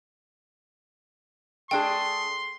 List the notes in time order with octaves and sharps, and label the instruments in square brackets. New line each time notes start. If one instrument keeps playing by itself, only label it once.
[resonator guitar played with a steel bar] A3 D4 G#4 [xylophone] G5 [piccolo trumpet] C6